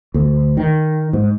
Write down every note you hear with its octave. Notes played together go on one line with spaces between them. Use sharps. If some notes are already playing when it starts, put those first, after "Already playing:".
D2
D#3
G#2